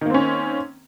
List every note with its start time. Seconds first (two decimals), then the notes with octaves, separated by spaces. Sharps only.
0.01 D#3
0.06 A#3
0.10 C4
0.14 C#4